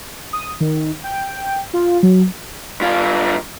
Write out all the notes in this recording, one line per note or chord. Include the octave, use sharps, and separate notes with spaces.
D#6
D#3
G5
F4
F#3
G2 F4